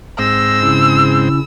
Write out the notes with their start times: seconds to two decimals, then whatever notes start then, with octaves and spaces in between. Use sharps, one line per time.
0.19 G#2 C4 E6 A#6
0.61 C#3 C#4 E4